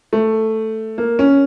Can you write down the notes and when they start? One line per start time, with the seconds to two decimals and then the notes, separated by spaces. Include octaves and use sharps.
0.13 A3
0.98 A#3
1.19 C#4